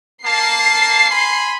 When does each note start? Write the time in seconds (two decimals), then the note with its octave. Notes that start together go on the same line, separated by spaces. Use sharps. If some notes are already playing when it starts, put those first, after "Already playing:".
0.25 A#3 A5 C7
1.10 G#5 B5 C6